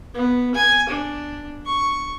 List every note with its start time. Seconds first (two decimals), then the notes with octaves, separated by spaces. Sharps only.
0.14 B3
0.55 G#5
0.89 D4
1.66 C#6